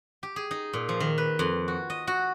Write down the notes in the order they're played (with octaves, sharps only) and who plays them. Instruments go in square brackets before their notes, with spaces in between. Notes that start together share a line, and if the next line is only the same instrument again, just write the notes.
[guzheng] G4
G#4
D#4
A#2
F3
D#3
B4
F2
F#4
D#5
F#4